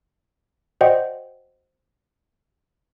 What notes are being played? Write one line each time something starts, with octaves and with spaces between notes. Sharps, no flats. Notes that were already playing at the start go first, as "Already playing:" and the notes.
F#4 C5 D5 D#5 F#5 G5